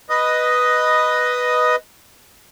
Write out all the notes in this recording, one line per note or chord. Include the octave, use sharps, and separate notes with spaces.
B4 D#5 D#6